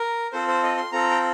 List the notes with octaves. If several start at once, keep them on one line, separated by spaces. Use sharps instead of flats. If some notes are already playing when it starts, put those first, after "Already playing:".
Already playing: A#4
C4 F4 A4 C5
C5
D#5
C6
C4 F4 A4 A#5
G5